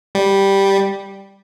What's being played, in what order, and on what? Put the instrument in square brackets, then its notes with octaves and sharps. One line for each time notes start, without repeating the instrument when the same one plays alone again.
[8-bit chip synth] G3